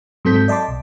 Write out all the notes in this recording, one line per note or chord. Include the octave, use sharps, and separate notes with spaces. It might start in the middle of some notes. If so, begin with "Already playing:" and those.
G#2 F#3 C4 A4 G6 B6
D5 D#5 A5 C6 D6
B1